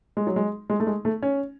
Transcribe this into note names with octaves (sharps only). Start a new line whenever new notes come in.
G#3
F#3
G#3
G#3
A3
G#3
A3
C#4